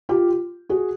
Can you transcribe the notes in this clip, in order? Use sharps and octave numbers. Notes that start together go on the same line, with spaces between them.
F4 G4
F#4 G#4